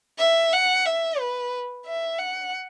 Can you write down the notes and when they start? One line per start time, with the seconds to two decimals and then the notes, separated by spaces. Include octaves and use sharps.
0.19 E5
0.53 F#5
0.86 E5
1.19 B4
1.86 E5
2.18 F#5